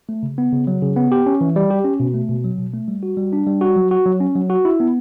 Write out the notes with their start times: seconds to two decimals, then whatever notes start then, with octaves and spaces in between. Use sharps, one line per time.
0.09 A3
0.23 C#3
0.38 B3
0.52 C#3
0.67 F#3
0.82 C#3
0.96 B3
1.12 G4
1.26 C#4
1.41 E3
1.56 G3
1.70 G4
1.85 C#4
2.00 B2
2.14 A3
2.29 B2
2.44 F#3
2.58 B2
2.73 A3
2.88 G3
3.03 F#4
3.17 G3
3.33 D4
3.46 G3
3.61 F#4
3.76 F#3
3.91 F#4
4.06 F#3
4.20 C#4
4.35 F#3
4.50 F#4
4.65 E4
4.80 B3